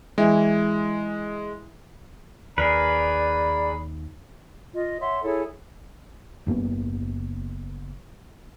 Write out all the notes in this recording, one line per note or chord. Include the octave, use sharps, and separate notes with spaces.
E3 G#3 E4 C#5
D#2 G#4 A#4 B4 D5 B5
F4 D#5
C#5 E5 F#5 C6
E4 G#4 A4 C#5
F#1 F#2 A#3 B3